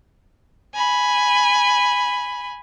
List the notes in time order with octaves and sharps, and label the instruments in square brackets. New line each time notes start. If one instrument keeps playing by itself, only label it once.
[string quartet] G#5 B5